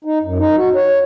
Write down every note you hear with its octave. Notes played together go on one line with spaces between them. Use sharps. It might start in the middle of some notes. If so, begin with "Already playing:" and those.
D#4
F#2
D#4
F#4
C#5